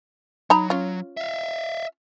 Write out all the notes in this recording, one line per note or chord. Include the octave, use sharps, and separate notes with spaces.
F#3 D#4 A#5 B5
C#4 F4
E5 F5